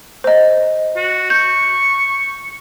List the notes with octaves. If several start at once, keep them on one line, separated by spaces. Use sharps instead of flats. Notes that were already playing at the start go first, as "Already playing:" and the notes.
C5 D#5
F#4
C#6 G6